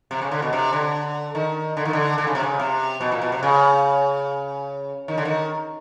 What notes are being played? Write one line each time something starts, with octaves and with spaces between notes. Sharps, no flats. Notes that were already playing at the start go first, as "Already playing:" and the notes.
C3
C#3
D3
B2
C3
D3
D#3
D3
D#3
D3
D3
C#3
C3
C#3
C3
B2
A#2
B2
C3
C#3
D#3
D3
D#3